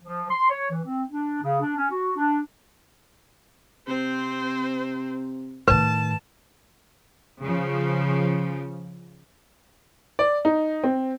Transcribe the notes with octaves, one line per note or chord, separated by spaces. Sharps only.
F3
C6
C#5
E3
C4
D4
C#3
D4
C#4
F#4
D4
C3 C4 C5
A2 D#3 B4 A5
C#3 F3
D5
D#4
C4